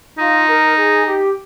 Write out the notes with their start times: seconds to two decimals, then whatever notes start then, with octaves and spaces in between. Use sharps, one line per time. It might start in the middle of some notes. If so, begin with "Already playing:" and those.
0.18 D#4 F4
0.48 A#4
0.77 G#4
1.06 G4